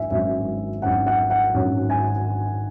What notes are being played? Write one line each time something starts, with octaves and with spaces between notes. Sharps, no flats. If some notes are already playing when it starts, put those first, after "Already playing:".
Already playing: G#1 G#2 F#3 E5 G#5
G#1 G#2 F#3 C#4 E5
G#1 G#2 F#3 C#4 F#5
F#5
F#5
G#1 G#2 F#3 C#4
G#5